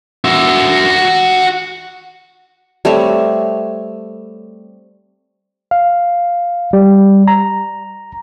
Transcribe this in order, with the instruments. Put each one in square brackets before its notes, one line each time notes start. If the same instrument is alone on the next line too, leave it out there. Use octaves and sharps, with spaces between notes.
[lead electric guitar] F#4 E5
[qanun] G3 A3 C4 C#5
[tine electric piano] F5
G3
A#5